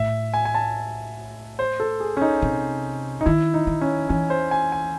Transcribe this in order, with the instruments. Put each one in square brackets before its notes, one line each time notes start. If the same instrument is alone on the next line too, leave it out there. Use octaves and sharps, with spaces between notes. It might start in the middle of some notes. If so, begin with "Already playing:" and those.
Already playing: [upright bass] A2 [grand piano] E5
[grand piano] G#5
G#5
A5
C5
A4
G#4
C#4
D#4
[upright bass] C3
[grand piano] D#4
[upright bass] D#3 [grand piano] E4
[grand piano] D#4
[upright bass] D#3
[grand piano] C#4
[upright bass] E3 [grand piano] C#4
[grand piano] C5
G#5
G#5